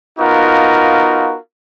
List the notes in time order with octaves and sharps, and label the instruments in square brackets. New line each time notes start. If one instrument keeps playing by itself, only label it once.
[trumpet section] B3 D#4 F4 F#4 A#4 F5